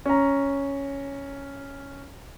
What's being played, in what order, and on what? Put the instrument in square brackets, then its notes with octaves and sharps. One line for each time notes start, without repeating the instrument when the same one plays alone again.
[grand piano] C#4 A#5